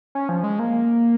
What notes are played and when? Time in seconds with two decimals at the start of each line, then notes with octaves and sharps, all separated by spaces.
0.15 C#4
0.29 F3
0.44 G#3
0.59 A#3